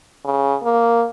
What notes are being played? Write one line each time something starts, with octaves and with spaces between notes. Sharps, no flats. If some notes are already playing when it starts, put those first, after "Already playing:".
C#3
A#3